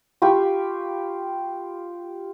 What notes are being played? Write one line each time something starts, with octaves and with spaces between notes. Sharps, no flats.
F4 G4 B5 C#6